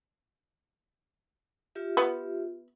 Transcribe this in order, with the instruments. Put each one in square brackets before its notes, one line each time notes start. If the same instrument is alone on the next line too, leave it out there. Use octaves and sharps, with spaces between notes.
[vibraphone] F4 G4 E5
[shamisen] B3